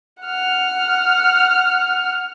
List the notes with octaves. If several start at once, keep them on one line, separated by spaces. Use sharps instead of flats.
F#5 F6